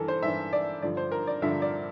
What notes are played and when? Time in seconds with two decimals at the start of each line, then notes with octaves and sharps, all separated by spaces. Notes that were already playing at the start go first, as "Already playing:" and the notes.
Already playing: G2 E3 A4 A#4
0.08 C5
0.23 G2 E3 E5
0.53 D5
0.82 G2 D3 F3 D5
0.97 C5
1.12 A#4
1.27 D5
1.42 G2 D3 F3 E5
1.62 D5